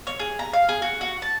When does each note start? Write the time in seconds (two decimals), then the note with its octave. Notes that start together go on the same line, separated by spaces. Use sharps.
0.07 C#5
0.19 G#4
0.39 A#5
0.54 F5
0.69 G#4
0.82 F#4
1.01 F#4
1.22 A5